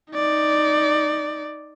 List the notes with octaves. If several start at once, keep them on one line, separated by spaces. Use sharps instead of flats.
D#4 D5